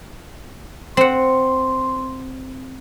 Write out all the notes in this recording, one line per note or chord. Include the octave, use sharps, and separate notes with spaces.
C4 F#5 C6